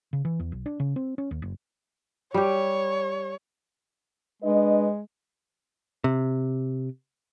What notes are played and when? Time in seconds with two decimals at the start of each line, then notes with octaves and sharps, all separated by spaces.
0.13 C#3
0.25 E3
0.40 E2
0.52 B1
0.66 D4
0.80 C#3
0.96 C4
1.18 C#4
1.31 D#2
1.42 F#1
2.34 G3 G4 C#5
4.42 G#3 D4 B4 D#5
6.04 C3